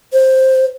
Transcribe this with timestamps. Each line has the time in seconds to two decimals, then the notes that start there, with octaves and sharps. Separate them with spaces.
0.13 C5